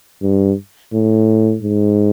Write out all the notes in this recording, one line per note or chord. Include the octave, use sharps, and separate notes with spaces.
G2
A2
G#2